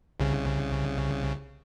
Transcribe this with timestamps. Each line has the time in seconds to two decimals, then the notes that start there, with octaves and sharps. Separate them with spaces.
0.20 C2 C#3